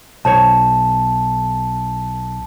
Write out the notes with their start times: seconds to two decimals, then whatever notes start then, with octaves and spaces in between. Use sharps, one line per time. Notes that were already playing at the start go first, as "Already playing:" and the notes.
0.25 B1 C5 C#5 A5